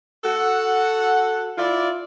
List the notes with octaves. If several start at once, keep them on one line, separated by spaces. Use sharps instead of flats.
F#4 A4 F#5
E4 F4 D5